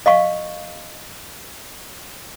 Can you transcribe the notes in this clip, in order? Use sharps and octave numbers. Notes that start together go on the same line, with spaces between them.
D#5 F5 C#6